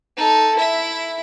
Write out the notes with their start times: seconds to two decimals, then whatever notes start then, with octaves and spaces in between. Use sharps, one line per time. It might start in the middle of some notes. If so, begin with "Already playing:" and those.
0.17 D#4 A4
0.55 E4 E5